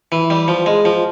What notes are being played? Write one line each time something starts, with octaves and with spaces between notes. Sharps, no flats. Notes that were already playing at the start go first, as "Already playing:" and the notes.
E3
G3
F3
G#3
F3